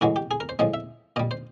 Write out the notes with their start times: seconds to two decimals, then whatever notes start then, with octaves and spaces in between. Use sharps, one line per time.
0.01 A2 E3 G#3 F#4
0.16 G4
0.31 G#4
0.40 A#4
0.49 C5
0.59 A2 F3 G#3 D#5
0.74 E5
1.16 A#2 G3 D#5
1.31 C5